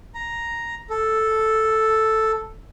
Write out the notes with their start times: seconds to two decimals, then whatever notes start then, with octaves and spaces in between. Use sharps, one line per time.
0.14 A#5
0.90 A4